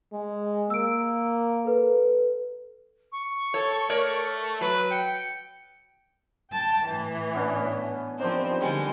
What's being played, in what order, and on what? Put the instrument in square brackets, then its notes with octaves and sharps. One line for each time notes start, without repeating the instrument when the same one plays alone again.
[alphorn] G#3
[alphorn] A#3 [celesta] E6 D7
[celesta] A4 B4
[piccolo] C#6
[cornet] A4 [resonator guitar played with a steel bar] C#5
[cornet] A3 [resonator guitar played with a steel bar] A#4 C#5 D5
[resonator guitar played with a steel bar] F#3 [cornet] B4
[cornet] G5 [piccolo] C#7
[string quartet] G5 A5
A2 E3
[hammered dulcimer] B3 C#4 D4
[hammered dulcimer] D#3 D4 G4 [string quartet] F3 C4 C5
[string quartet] D3 G3 G#3